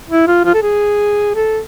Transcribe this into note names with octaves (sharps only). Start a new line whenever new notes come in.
E4
F4
F4
A4
G#4
A4